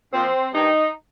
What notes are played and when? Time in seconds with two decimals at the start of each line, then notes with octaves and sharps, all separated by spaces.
0.12 A#2 F3 C4
0.53 G2 D#3 D#4